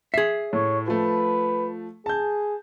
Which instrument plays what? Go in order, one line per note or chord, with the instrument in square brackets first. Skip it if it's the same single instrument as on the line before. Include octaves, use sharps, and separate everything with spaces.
[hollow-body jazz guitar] G#4 E5 [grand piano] C7
[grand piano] A2 [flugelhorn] C#5
[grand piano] F3 A3 [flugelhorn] B4
[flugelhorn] G#4 [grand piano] A5 G6